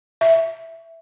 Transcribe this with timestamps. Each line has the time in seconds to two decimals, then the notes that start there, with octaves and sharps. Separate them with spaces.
0.21 E5